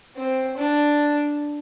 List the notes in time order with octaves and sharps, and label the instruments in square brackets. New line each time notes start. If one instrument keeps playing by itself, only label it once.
[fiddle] C4
D4